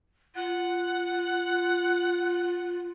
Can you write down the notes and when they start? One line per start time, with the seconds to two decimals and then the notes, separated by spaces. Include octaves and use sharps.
0.35 F4 F#5